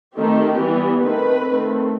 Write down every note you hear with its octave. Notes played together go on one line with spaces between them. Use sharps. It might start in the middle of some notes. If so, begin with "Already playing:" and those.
D#3 A3 C4 G4
E3 G3 B3
D#3 A3 C4 B4
D#3 A3 C4